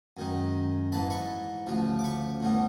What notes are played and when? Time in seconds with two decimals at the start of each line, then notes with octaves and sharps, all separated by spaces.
0.17 F#2 D#3 G#3
0.92 G#2 E3 G#3 A5 B5
1.10 B5 C#6
1.67 D2 C#3 F3
1.99 D6
2.04 B5 C#6
2.40 A2 E3 G3 B3